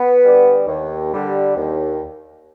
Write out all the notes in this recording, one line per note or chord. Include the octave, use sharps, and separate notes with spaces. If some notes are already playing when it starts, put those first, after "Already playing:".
Already playing: B3
D3 G3
D#2
D3 G3
D#2